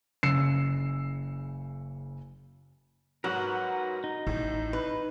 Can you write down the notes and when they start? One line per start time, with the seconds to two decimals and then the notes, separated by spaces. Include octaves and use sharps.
0.23 F#1 C#3 E6 C7 C#7 E7
3.24 G#2 F#3 F#4 A#4 B4 F#5
4.04 D#4
4.27 A1 A2
4.73 B4